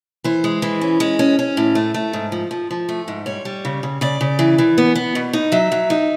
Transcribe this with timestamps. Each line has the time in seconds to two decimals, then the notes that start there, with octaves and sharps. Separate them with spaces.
0.24 E3 C5
0.44 G#3
0.62 E3
0.81 C#4
1.00 G#3
1.19 C#4
1.39 C#4
1.57 A2
1.75 A3
1.94 A3
2.13 G#2
2.32 F3
2.51 F3
2.71 F3
2.89 A3
3.08 G#2
3.26 G3 C#5
3.45 G3
3.65 C#3
3.83 C#3
4.01 C#3 D5
4.21 C#3
4.39 E3
4.58 E3
4.78 B3
4.95 B3
5.15 B2
5.33 D#4
5.52 F#3 E5
5.72 F#3
5.90 D#4